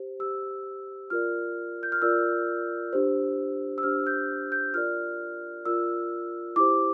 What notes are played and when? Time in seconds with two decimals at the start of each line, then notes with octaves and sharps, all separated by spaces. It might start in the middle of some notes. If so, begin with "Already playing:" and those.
Already playing: G4 C5
0.20 G4 C5 E6
1.10 F4 A#4 D5 F6
1.83 G6
1.92 F6
2.02 F4 A#4 D5 E6
2.93 D4 G4 C5
3.78 E6
3.83 D4 G4 C5 F6
4.07 G6
4.52 G6
4.74 F4 A#4 D5 F6
5.65 F4 A#4 D5 E6
6.56 E4 G4 C5 D6